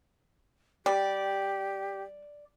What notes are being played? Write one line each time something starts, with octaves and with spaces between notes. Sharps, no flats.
G3 G4 D5